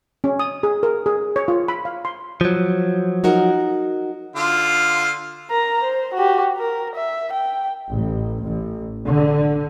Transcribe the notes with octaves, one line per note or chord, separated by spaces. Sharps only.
C#4
D#6
G#4
A#4
G#4
C#5
F4
B5
F5
C6
F3 F#3
D#4 F#4 A#4
D3 F4 F5
A#4 A#5
C5
F#4 G4
A#4
E5
G5
A1
A1
D3